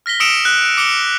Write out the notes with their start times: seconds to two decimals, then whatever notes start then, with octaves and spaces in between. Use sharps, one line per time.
0.06 F6 A#6 B6 G7
0.20 D#6 E6 C#7 D7 E7 F7
0.45 F#6
0.77 D6 C#7 F7 G7